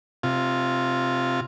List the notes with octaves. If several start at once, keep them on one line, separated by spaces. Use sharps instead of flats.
C3 F4